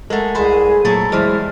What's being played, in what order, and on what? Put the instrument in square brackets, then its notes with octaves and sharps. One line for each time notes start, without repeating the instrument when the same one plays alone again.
[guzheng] G#3 A3 [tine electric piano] A4 A#4 F#5
[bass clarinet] C2 [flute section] G#4 [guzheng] B4 C5 E5
[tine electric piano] A#2 [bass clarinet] F#3 [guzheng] A3 E4 A4
[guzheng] E2 G3 [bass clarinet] G#3 [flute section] E4 F6 [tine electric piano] G#4 C5